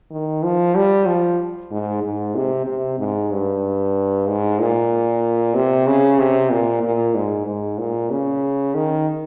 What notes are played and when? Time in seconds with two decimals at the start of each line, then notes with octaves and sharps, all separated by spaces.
0.11 D#3
0.43 F3
0.75 G3
1.07 F3
1.71 G#2
2.03 G#2
2.35 C3
2.67 C3
2.99 G#2
3.31 G2
4.27 G#2
4.59 A#2
5.55 C3
5.87 C#3
6.19 C3
6.50 A#2
6.83 A#2
7.15 G#2
7.47 G#2
7.79 A#2
8.10 C#3
8.74 D#3